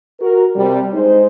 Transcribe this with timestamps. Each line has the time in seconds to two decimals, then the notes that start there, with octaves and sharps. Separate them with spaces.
0.19 F#4 A#4
0.55 C3 G3
0.93 G#3 D#4 C5